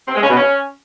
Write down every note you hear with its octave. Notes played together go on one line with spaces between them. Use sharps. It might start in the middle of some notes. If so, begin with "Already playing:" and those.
C4
G#3
C#4
B2
C#4